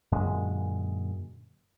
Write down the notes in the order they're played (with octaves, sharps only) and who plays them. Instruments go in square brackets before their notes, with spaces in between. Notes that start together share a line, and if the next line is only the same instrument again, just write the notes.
[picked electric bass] F#2 A#2 D3 G#3